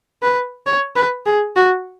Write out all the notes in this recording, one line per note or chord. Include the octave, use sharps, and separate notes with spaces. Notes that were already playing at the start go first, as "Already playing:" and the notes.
B4
C#5
B4
G#4
F#4